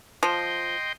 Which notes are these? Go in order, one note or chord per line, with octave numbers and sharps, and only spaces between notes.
F3 D#5 G5 C6